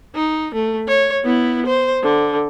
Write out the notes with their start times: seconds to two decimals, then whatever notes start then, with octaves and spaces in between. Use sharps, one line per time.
0.15 D#4
0.55 A3
0.88 C#5
1.24 B3 E4
1.66 C5
2.03 D3